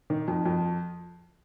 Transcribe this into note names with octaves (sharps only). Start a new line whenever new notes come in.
D#3
F2
F2